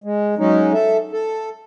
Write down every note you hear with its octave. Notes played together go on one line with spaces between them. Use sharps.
G#3
F#3 G#3 C#4 D#4
A4 E5
A4